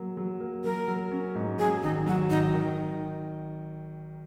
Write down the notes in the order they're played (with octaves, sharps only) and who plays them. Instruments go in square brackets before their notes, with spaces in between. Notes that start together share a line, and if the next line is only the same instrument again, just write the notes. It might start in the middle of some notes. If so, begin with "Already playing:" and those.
Already playing: [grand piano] F#3 A#3
F#3
A#3
[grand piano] F#3 [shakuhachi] A#4
[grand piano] F#3
C#4
G#2
[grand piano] F#3 [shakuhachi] G#4
[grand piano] G#1 [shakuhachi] D#4
[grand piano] F#3 [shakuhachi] F#4
[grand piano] G#1 [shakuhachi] D#4
[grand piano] D#3